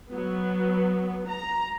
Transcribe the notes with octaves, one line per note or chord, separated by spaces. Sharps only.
F#3 B3
A#5